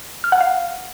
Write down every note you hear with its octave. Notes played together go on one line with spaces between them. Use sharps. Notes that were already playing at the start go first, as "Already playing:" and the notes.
F6
F#5
F5